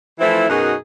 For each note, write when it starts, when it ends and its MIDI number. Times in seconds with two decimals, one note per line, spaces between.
0.20 0.47 52
0.20 0.47 53
0.20 0.47 57
0.20 0.47 60
0.20 0.47 64
0.49 0.74 42
0.49 0.74 47
0.49 0.74 63
0.49 0.74 66
0.49 0.74 68
0.49 0.74 70